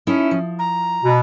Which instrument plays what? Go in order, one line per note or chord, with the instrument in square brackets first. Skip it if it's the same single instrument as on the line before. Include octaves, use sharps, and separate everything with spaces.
[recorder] C#4 [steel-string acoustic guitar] D#4 E4 A4
[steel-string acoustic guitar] F3
[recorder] A#5
[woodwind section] B2